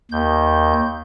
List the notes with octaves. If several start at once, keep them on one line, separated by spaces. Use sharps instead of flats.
D#2 G6